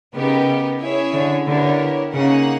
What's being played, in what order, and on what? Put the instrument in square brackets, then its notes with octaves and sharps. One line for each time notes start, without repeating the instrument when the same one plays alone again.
[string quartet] C#3 [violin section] B3 D#4 G4 A#4
[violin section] C#4 E4 G#4 C#5 E5
[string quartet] D3
[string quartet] D3 [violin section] B3 E4 G4 A#4 C#5
[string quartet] C#3 [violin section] A#3 D#4 G#4 C#5 F#5